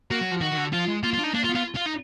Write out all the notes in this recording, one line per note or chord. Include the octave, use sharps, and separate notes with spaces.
A#3 F#4
F#3
F3
D#3 F#4
D#3
D3
F3 F4
G#3
A#3 F4
F4
D4 D#4
A#3 D4
F4
B3
F4
F4
D#4